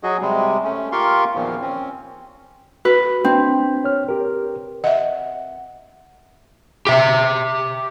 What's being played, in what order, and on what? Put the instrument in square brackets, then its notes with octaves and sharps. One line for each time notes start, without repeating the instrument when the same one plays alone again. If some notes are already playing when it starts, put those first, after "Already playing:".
[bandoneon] F#3 F#4 G#4 D#5
C3 G3 G#3
A3 C#4
F4 G4 A#4 F5 C6 C#6
E2 A#2 D#3 F3
C4 C#4
[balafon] F#4 [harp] B4
[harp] C4 [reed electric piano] D4
[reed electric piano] C#5 F6
G4 A#4
[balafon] D#5 E5 [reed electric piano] F#5
[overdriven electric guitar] G4 E5